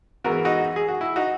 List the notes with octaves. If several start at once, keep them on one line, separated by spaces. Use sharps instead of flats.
G#2 E3 G#3 B3 F#4 A#4
D#4 F#4
G#4
F#4
E4
D#4 F#4